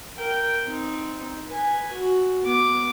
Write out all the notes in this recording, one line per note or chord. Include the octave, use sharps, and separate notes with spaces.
A#4 G5
C4 D#4
B4 G#5
F#4
B3 D6